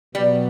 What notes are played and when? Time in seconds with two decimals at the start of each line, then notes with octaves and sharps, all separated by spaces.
0.14 B2 F#3 G3 B3